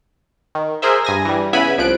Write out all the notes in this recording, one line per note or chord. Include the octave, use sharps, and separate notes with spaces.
D#3
G#4 A#4 C5 E5
G2 G#5 A#6
E3 G3
C#3 B3 E4 E5 G#5 B5
C2 F3 F#6 D7